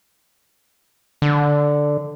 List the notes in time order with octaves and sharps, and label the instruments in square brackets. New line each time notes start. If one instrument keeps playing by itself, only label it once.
[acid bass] D3